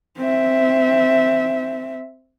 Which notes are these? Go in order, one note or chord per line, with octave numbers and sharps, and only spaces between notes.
C4 E5